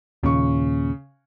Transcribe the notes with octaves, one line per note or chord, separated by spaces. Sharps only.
D#2 A#2 C#3 C#6